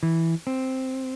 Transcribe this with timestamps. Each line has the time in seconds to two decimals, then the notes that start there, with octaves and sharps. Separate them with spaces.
0.03 E3
0.47 C4